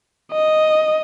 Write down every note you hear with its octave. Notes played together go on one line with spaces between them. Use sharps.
D#5